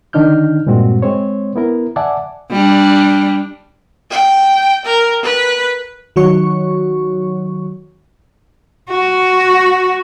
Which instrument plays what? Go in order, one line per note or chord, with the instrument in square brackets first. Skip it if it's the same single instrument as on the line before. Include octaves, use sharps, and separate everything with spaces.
[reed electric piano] D3 D#3 D4 D#4 F6 G6
G2 A#2 G#3 C4 F#4
G#3 C4 C5 C#5
B3 E4 A#4
D5 E5 F#5 G#5 A5 D6
[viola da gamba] G3 D4
[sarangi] G5
A#4
B4
[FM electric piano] D#3 F#3 F#4 C#5 C#6
[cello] F#4